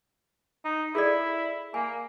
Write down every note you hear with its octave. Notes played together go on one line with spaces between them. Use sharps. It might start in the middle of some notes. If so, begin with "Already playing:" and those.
D#4
E4 G#4 A4 D5
A#3 G#5